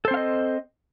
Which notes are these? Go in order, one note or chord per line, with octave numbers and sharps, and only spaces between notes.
C4 A4 C5 D#5 F5